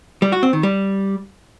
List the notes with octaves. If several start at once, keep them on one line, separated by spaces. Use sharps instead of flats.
G3
F#4
C4
D#3
G3